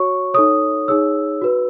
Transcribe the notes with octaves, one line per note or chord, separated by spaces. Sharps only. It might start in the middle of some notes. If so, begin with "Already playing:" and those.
Already playing: F#4 C#5 C#6
D#4 A4 C#5 D#6
D#4 G#4 C#5 E6
F#4 B4